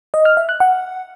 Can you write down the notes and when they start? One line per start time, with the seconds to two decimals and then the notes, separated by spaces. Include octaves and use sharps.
0.14 D#5
0.25 F6
0.37 E5
0.49 F#6
0.60 F#5